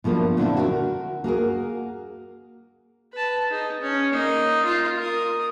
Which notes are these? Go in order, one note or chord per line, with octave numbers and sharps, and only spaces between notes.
B2 F3 A3 A#3 D4
A#2 D3 A3 C4 D4 E4
F#4 A#4
A#3 F#4 G#4 A#4
B4 A5
D#4 G#4
C#4
A#3 D#4
F4
A#4 D#6